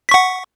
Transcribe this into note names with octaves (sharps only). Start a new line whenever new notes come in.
F#5 C#6 B6